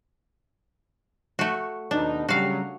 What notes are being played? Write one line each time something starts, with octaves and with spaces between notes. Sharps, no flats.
A3 F#4
D#2 B2 D4 D#4
C#3 F#3 G3 F#4 F5